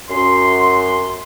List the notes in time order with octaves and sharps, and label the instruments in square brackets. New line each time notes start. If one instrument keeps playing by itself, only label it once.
[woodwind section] F#2 C6